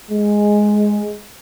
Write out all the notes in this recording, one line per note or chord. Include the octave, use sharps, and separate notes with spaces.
G#3